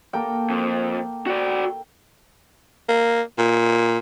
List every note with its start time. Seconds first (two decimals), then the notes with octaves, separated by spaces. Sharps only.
0.13 A#3 A4 G5
0.50 F2
1.26 F#4 D5 G5
2.89 A#3
3.38 A#2